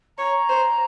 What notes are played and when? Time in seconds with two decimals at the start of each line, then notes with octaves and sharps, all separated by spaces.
0.18 C#5 A#5
0.49 C5